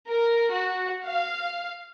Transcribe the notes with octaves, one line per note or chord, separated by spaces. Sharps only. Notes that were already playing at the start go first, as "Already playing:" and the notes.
A#4
F#4
F5